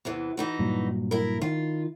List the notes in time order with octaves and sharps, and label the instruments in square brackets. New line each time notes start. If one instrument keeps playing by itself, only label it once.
[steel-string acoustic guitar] E2 C3 E3
E3 D#4 F#4
[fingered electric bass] G2 A#2 F#3
[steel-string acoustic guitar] E4 A#4
[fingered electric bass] D#3 [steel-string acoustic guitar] F4